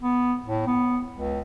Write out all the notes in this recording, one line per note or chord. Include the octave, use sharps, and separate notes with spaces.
B3
A2
B3
C#2